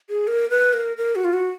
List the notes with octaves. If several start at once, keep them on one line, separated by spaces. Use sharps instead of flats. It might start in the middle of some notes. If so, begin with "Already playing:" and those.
G#4
A#4
B4
A#4
A#4
F#4
F4
F#4